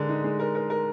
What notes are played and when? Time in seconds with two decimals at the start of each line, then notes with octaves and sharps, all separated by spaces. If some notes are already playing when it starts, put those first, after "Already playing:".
Already playing: D3 G#3 A#4
0.09 D#4
0.24 G#3
0.40 A#4
0.55 A#4
0.70 A#4